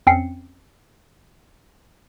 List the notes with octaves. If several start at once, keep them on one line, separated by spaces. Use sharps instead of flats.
F2 C4 C#4 G5 C7 C#7